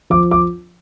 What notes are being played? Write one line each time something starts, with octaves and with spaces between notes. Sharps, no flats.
F3 D6
D6